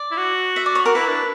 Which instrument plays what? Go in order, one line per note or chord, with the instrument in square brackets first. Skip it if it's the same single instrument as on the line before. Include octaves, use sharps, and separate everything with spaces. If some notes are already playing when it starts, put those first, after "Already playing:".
Already playing: [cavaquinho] D5
[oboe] E4
F#4
[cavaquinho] E5
D5
C#5
[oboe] F#4 [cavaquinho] A#4
[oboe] E4 [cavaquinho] B4
[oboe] D4